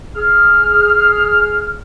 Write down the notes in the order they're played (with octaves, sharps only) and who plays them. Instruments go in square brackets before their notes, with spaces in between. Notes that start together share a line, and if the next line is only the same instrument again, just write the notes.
[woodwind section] G#4 F6